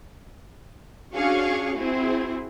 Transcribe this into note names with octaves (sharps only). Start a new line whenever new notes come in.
C#4 D4 F#4 G#4 F5 C#6
C4 E4 F#4 G#4